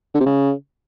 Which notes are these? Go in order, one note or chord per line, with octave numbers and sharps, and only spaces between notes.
D3
C3
C#3